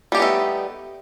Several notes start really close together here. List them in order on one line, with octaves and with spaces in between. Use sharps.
G3 G4 D#4 B3 A3